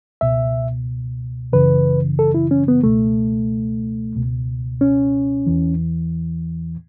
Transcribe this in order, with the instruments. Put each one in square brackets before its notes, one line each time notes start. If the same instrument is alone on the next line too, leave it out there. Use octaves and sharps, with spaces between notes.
[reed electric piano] C#2 B2 E5
F#2 C#3 E3 B4
A4
E4
C#4
B3
C#2 B2 A3
C#2 B2
C#4
E2 E3